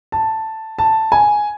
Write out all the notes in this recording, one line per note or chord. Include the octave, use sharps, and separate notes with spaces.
A5
A5
G#5